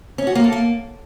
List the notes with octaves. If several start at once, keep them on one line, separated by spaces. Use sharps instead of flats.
C#4
F#4
A#3
A4
A#3